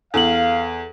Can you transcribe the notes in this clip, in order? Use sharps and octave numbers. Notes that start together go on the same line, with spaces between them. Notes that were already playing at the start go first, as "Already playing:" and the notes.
E2 A4 F5 F#7